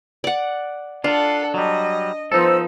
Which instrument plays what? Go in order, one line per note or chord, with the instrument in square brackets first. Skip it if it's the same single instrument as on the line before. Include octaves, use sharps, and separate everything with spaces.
[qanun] D5 F#5
[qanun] D4 [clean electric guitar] F4 [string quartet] A4 F#5
[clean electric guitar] F#3 G3 [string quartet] D#5
[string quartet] F3 B3 [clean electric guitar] D#4 A4 [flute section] C5 E6